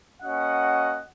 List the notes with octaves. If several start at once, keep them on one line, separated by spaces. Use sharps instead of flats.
A#3 C#4 F#4 D#5 F#5